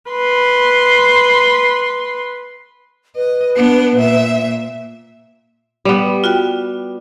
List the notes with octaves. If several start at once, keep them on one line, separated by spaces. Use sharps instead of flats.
B4 C6
B4 D#5
B3 D4
A#2 E5
G3 B3
F4 F#4 G5